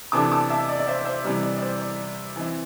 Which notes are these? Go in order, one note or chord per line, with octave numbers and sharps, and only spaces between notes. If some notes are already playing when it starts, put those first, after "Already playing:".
C3 E3 A3 D4 A5 D6
A5 D6
E5 A5
D5
D5
C5 E5
C5 E5
C3 E3 G3 D5
D5
D5
C5
D5
E3 C4 E4